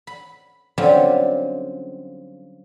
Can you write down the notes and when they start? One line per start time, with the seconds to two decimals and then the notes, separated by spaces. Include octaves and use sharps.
0.07 B5
0.78 D3 F#3 G3 C4 C#4 F4